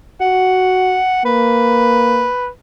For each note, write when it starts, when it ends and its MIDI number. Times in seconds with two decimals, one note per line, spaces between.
0.21 0.99 66
0.21 1.23 78
1.25 2.27 58
1.25 2.48 71